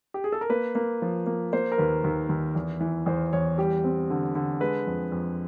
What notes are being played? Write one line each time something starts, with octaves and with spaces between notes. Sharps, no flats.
G4
G#4
A4
A#4
A#3 B4
A#3
F3
A#3
A#3 C5
A#4
D#2 B4
D#2
D#2
E2
E3
E2 C5
E2 C#5
G3 G4
C4
D3
D3
G#3 B4
F2
F2